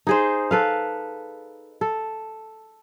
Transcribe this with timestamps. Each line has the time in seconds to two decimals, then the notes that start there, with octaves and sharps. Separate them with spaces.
0.07 D#4 G#4 C5
0.51 A4 B4 F5
1.81 A4